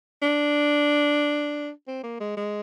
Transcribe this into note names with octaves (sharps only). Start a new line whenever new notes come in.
D4
C4
A#3
G#3
G#3